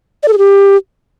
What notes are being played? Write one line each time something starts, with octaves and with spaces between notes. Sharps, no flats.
D5
A4
G#4
G4